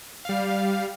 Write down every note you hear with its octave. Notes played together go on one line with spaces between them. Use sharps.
G3 F5